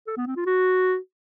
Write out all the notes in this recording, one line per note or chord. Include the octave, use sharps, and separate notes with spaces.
A4
B3
C4
F4
F#4